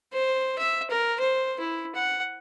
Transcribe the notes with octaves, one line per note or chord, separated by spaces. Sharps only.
C5
E5
A#4
C5
E4
F#5